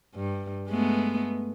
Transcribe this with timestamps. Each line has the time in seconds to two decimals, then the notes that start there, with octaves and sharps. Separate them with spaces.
0.15 G2
0.68 G#3 A3 B3